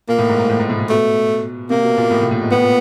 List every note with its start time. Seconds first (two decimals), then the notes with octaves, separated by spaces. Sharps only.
0.08 A#2 A#3
0.18 A2
0.29 G#2
0.39 G#2
0.49 A2
0.59 G#2
0.70 A2
0.80 A2
0.89 B2 A3
1.70 C3 A#3
1.84 B2
1.98 A#2
2.11 A2
2.21 A2
2.31 A2
2.41 G#2
2.51 A2 B3
2.62 A#2